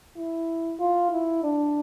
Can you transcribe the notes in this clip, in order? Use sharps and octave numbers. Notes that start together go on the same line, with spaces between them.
E4
F4
E4
D4